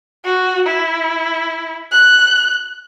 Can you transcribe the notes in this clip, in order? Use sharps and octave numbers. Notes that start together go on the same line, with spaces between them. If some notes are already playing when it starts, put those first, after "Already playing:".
F#4
E4
F#6